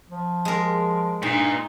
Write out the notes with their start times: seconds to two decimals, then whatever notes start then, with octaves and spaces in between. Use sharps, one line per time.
0.10 F3
0.45 G#3 A#4
1.23 G2 A#2 D#4 G5